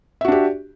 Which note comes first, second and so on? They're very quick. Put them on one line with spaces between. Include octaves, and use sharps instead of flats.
E5 F#4 D4 G4